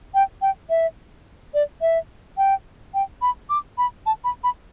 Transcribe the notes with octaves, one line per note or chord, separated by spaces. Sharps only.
G5
G5
E5
D5
E5
G5
G5
B5
D6
B5
A5
B5
B5